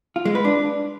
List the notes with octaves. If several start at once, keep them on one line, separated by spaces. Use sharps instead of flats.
F4
G#3
B4
D4